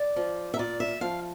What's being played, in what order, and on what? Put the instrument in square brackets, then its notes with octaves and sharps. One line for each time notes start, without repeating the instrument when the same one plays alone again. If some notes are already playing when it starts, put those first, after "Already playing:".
Already playing: [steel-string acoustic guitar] D5
F3
E5
A#2 D5
E5
F3 F5